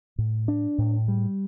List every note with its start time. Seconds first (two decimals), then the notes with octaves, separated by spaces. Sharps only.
0.18 A2
0.48 D4
0.78 A2
1.08 G3